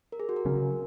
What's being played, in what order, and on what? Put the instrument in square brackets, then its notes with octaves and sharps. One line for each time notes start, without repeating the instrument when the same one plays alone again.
[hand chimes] A#4
G#4
F#4
A#4
[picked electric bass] C#3 F#3 C#4